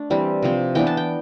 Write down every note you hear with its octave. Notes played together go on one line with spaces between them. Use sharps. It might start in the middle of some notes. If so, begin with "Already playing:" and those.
Already playing: A3 D4
E3 G3 C4
C3 F3 C4
E3 B3 D4 G5
A5
G5